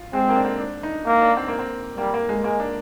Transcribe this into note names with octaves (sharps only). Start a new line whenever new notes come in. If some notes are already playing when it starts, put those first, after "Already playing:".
Already playing: F4
G#3 C4
A#3
D4
C4
D4
D#4
A#3
D4
C4
A#3
C4
G3 A#3
A#3
G#3
G#3 A#3
D4